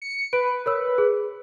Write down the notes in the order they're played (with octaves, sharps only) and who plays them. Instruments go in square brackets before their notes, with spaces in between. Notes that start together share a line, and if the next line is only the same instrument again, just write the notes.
[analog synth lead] C#7
[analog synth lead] B4 [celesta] D7
[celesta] A#4 C#5 E6
G#4